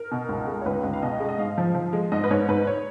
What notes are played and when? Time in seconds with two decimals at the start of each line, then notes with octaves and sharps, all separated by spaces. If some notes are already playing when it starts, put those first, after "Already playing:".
Already playing: A#4
0.11 B2
0.29 C#2
0.47 G#3
0.61 C#5
0.66 C#2 B4
0.84 C#2
0.93 F5
1.03 B2 D#5
1.20 G#3
1.29 D#5
1.39 G#2 F5
1.58 F3
1.75 F3
1.93 G#3
2.12 G#2 D#5
2.24 B4
2.31 G#2 C#5
2.48 G#2 B4
2.67 C#5